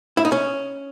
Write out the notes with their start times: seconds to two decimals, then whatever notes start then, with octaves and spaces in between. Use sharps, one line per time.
0.17 E4
0.25 D#4
0.32 C#4